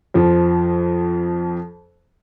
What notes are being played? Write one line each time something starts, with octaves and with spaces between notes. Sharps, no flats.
F2 F3